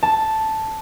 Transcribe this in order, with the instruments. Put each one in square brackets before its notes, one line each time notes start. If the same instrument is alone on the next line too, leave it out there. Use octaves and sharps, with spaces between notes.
[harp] A5